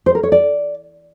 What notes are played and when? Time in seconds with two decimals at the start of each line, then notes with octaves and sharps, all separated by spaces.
0.06 C5
0.15 A#4
0.23 C#5
0.32 D5